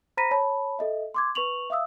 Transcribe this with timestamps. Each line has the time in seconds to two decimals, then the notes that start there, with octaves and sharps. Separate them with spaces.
0.17 C5 A#5 B5 A#6 B6 D#7
0.31 C#5 A5 B5
0.79 A4 D#5 E5
1.14 C6 D6 G#6
1.35 B4 C#6 F7 F#7
1.70 E5 F5 D#6 E6